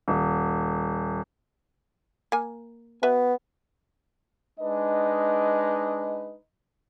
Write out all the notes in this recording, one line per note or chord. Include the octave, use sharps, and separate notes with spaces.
D#1
A#3 G#5
B3 F#4 B4 E5
G#3 D4 D#4 B4 D#5